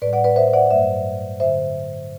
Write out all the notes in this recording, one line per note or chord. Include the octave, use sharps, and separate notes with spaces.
A2 G3 B4 D5
D5 F#5
B4 D5
C5 E5
E5
D5 F#5
G2 F#3 A3 C5 E5
D3 C5 E5